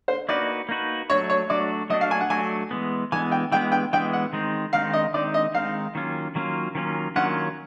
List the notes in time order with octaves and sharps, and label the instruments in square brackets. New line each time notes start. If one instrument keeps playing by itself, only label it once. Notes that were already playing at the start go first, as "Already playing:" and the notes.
[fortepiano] C5
[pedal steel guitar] A#3 D#4 F#4 B4 [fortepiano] D5
[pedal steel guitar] A#3 D#4 F#4 B4
[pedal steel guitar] F#3 A3 D4 F#4 [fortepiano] C#5
[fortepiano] C#5
[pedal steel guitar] F#3 A3 D4 F#4 [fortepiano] D5
[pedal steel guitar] F#3 A3 D4 F#4 [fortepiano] D#5
[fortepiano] F5
G#5
F#5
[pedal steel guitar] F#3 A3 D4 F#4 [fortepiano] G#5
[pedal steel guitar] E3 G#3 B3
[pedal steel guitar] E3 G#3 B3 [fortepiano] G#5
[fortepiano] G5
[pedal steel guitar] E3 G#3 B3 [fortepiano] G5
[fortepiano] G5
[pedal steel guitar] E3 G#3 B3 [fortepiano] G5
[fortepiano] F#5
[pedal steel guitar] D#3 G#3 C4 D#4
[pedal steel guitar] D#3 G#3 C4 D#4 [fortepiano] F5
[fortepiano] D#5
[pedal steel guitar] D#3 G#3 C4 D#4 [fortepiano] D5
[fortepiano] D#5
[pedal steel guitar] D#3 G#3 C4 D#4 [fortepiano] F5
[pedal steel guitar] D#3 F#3 A#3 C#4 F4
D#3 F#3 A#3 C#4 F4
D#3 F#3 A#3 C#4 F4
[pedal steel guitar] D#3 F#3 A#3 C#4 F4 [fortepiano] F#5